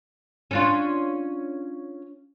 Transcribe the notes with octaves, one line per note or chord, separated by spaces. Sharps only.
C#4 D4 F4